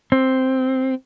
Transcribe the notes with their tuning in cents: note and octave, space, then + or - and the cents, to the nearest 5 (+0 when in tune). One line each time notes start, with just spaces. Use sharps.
C4 +0